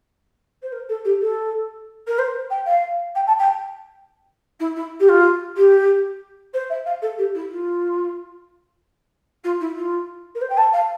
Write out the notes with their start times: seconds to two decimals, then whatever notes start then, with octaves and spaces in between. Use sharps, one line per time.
0.62 C5
0.72 A#4
0.89 A4
1.04 G4
1.21 A4
2.07 A#4
2.18 C5
2.50 G5
2.66 F5
3.15 G5
3.27 A5
3.38 G5
4.60 E4
4.76 E4
5.00 G4
5.09 F4
5.57 G4
6.53 C5
6.70 E5
6.86 F5
7.02 A4
7.18 G4
7.34 E4
7.51 F4
9.44 F4
9.60 E4
9.76 F4
10.35 A#4
10.41 C5
10.49 G5
10.57 A5
10.73 F5